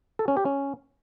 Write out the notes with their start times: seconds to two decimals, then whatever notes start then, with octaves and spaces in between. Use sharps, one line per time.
0.19 A4
0.28 C#4
0.37 G4
0.45 C#4